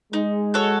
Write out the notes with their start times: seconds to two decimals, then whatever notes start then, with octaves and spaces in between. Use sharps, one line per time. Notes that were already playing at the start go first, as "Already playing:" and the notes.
0.13 G#3 D#4
0.54 F#4 A4 C#5